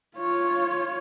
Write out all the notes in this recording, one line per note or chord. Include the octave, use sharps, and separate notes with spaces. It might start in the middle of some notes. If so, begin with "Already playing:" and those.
F4 C#5